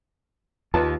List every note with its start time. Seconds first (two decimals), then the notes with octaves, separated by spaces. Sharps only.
0.74 D#2 F4 B4 A5